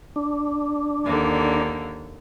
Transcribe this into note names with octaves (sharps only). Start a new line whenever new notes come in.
D4
D#2 D3 A#3